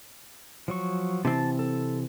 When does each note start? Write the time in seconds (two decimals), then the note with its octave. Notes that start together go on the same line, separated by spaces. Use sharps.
0.68 F3 F#3 C#6
1.25 C3 E3 C4 A5
1.59 A4